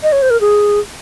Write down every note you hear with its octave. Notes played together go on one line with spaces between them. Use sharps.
D#5
C#5
C5
A#4
G#4